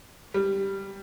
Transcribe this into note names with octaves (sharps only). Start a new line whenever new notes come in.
G3